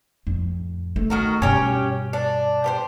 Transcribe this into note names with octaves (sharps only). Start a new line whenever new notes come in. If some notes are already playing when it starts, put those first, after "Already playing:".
F2 A2
A3
D#3 F#4 A#4
G2 B2 C#4 G4 C#5
D4
G4 B4 C5